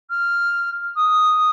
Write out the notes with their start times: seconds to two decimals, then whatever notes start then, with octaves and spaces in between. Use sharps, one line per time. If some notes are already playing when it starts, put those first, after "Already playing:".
0.10 F6
0.96 D#6